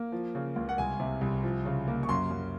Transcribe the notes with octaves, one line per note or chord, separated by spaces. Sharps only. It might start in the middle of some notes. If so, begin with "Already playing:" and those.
Already playing: A#3
F3
C#3
C#2
F#5
C2 G#5
C3
C2
F3
C#3
A#3
C#6
F#2 C6
F#2